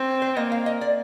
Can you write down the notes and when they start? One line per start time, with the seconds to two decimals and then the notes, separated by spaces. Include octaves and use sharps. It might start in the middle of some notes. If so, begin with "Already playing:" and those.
Already playing: C4
0.22 C5
0.37 A#3 D#5
0.52 F5
0.66 D#5
0.81 D5